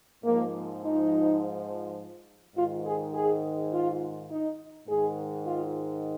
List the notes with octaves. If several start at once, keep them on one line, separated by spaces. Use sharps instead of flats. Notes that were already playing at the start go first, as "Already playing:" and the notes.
G#2 F3 A#3
D#4
G#2 D#3 F4
G#4
G#4
F4
D#4
G#2 D#3 G#4
F4